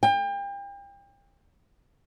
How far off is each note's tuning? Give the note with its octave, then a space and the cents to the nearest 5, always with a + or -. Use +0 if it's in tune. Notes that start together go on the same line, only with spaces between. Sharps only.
G5 +35